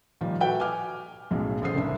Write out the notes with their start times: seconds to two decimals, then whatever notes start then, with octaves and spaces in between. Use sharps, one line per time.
0.21 A#2 D#3 F3 G3
0.40 F#4 A4 B4 E5 G5
0.60 G#5 D6 F6
1.31 B1 F#2 A2 G#3
1.61 A1 C#3 A4 C5 D#6 C7
1.75 F#1 C2 D4 E5